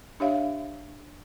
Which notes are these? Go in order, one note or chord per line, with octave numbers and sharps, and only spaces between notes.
D4 G4 C#5 E5 F5